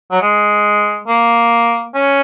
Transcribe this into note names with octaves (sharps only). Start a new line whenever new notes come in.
F#3
G#3
A#3
C#4